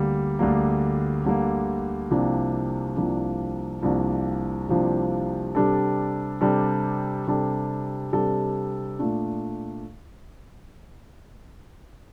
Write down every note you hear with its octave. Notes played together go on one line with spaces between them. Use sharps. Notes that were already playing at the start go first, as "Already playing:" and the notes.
Already playing: D2 D3 G3 A#3
D2 D3 G3 A#3
D2 D3 G3 A#3
C2 C3 F3 A#3 D4
C2 C3 F3 A#3 D4
C2 C3 F3 A#3 D4
C2 C3 F3 A#3 D4
C3 G3 D4 A4
C3 G3 D4 A4
C3 G3 D4 A4
C3 G3 D4 A4
A#2 A3 D4